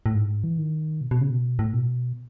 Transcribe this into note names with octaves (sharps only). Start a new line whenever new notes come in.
A2
G#2
E3
D#3
B2
B2
C#3
B2
A2
B2